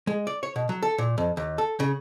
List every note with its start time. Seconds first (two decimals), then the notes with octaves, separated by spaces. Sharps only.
0.07 G#3
0.27 D5
0.43 C#5
0.56 B2
0.69 F#3
0.83 A4
0.98 A#2
1.18 F2
1.37 D#2
1.58 A4
1.80 C#3